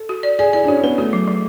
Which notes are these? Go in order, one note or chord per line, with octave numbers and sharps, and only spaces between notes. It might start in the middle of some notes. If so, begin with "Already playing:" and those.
Already playing: A4
F#4
D5
G#4 D5
E4 D5
D4
C#4 F#4
B3 B4
A3 F#4
F#3
F#3